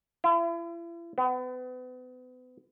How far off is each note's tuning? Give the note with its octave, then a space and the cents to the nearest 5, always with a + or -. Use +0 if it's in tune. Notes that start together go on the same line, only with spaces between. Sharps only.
E4 +45
B3 +35